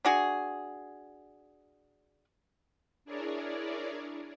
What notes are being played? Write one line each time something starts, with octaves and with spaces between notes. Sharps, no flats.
D4 F#4 G#4
D4 E4 G#4 A#4 C#5 D5